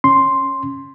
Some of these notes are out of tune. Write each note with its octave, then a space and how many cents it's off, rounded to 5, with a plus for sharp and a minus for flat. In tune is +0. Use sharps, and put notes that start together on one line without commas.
C#4 -5 C6 +0